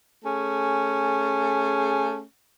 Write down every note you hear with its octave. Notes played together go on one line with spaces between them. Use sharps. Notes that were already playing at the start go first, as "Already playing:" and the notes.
A3 C#4 G#4